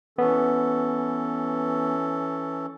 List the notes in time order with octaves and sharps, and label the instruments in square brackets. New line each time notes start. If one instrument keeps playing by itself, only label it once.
[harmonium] E3 C#4 A4 [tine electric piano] B3